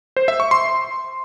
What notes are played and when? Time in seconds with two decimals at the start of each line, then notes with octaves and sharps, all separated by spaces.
0.17 C5
0.28 E5
0.40 C#6
0.51 C6